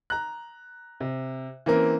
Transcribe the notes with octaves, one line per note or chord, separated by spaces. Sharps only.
A#5 F#6
C3
E3 A#3 C4 C#4 A#4